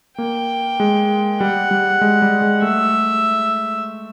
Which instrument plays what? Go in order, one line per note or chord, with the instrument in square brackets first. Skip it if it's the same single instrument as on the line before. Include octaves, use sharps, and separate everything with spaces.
[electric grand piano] A#3 [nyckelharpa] G5
[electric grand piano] G#3
[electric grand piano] G3 [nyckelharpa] F#5
[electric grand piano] G3
G#3
G3
G#3
[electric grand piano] A3 [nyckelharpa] E5